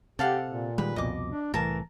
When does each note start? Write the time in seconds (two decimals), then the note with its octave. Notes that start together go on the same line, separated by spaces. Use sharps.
0.19 C3 G4 A4 F5 F#5
0.48 A#2
0.78 D#3 G3 G#3 B4
0.96 C2 F2 B2 D#5 D6
1.28 D4
1.54 C2 A2 E3 A#4 A5